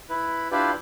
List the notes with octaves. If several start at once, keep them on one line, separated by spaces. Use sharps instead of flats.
E4 B4
D4 E4 F4 G4 B4 D5